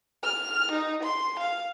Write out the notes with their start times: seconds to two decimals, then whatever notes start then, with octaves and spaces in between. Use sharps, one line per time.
0.23 F6
0.72 D#4
1.03 C6
1.40 F5